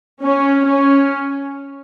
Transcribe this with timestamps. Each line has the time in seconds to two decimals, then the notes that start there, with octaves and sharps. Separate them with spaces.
0.23 C#4
0.66 C#4